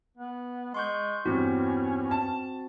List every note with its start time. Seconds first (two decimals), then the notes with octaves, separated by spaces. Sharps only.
0.17 B3
0.74 G#3 C6 C#6 G6
1.25 E2 G2 C4 C#4 F#4
2.11 A5